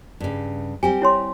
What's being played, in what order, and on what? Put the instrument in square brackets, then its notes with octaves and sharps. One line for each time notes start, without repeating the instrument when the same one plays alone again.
[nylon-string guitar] G2 C#3
[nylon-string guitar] G3 C4 G4 [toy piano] G#5
[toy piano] E4 C#5 C6